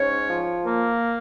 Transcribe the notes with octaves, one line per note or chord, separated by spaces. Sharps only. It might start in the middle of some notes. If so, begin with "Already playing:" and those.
Already playing: G#2 C#4 C#5
F3
A#3